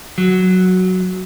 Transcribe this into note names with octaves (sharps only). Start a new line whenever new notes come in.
F#3